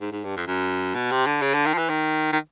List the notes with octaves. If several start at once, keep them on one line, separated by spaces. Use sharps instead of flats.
G#2
G#2
G2
F2
F#2
B2
C3
D3
C#3
D3
D#3
F3
E3
D#3
D#3